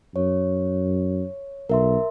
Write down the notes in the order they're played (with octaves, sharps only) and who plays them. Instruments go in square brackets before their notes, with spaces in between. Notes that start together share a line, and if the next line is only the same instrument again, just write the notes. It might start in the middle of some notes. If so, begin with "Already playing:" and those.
[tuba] F#2 [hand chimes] C#5
[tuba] B1 [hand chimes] A#4 E5 C6